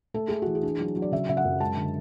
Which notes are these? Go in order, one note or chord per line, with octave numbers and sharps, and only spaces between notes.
A3 A4
A3 G#4
E3 F#4
G#4
D4
F#3
F#3
D5
C#3 E5
C#3 E5
F#5
F#2
G#3 A5
D3